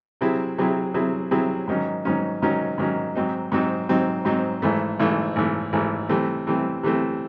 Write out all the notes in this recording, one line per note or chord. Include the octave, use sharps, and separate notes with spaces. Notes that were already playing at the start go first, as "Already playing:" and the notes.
C3 F#3 C4 E4 G#4
C3 F#3 C4 E4 G#4
C3 F#3 C4 E4 G#4
C3 F#3 C4 E4 G#4
G#2 D#3 F#3 C#4
G#2 D#3 F#3 C#4
G#2 D#3 F#3 C#4
G#2 D#3 F#3 C#4
G#2 F#3 C4 D#4
G#2 F#3 C4 D#4
G#2 F#3 C4 D#4
G#2 F#3 C4 D#4
G#1 G#2 E3 A3
G#1 G#2 E3 A3
G#1 G#2 E3 A3
G#1 G#2 E3 A3
C3 E3 A3 C4
C3 E3 A3 C4
C3 E3 A3 C4